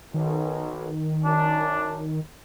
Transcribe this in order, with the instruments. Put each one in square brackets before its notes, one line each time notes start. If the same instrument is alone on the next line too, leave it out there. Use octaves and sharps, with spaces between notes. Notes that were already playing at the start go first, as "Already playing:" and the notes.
[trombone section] B1 [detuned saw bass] D#3
[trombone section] F#2 D4